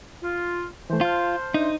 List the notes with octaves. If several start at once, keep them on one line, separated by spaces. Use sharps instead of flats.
F4
E3 A3 C5
F4 A5 C6 F6
D4 D#4 E5 C6